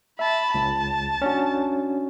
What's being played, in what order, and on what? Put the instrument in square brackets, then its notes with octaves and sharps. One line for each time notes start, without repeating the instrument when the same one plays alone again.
[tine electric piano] E5 [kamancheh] A5 B5
[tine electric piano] C#2 [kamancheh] A5
[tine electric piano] C#4 D4 F#4